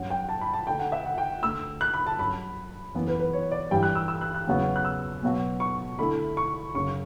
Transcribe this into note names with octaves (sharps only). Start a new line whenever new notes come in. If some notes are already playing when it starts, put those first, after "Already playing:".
Already playing: G2 F#3 C#4 F#4 F#5
G5
A5
B5
A5
D3 A3 D4 F#4 G5
F#5
E5
F#5
G5
D2 D3 A3 E6
F#6
B5
A5
G2 F#3 C#4 F#4 B5
F#2 E3 B3 E4
B4
B4
C#5
D5
G2 E3 G3 G5
F#6
E6
E6
F#6
F#6
E2 C#3 F#3 B3 F#4
F#6
E6
B2 F#3 B3 F#4
C#6
D3 A3 E4 B5
C#6
F#2 C#3 F#3 C#6